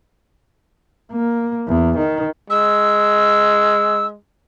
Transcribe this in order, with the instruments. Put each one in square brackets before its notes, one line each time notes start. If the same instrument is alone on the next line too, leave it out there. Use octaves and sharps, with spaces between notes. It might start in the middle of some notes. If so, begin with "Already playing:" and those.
[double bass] A#3
E2
D#3
[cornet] G#3 [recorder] E6